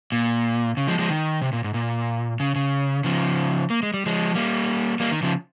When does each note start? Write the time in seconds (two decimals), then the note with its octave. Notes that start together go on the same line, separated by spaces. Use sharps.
0.12 A#2
0.77 C#3
0.87 F3 G#3
0.99 F3 G#3
1.10 D#3
1.42 C3
1.53 A#2
1.64 G#2
1.74 A#2
2.40 C#3
2.56 C#3
3.04 C#3 F3
3.70 A#3
3.83 G#3
3.94 G3
4.06 F3 G#3
4.35 G3 A#3
5.00 G3 A#3
5.12 D#3
5.23 C#3 F3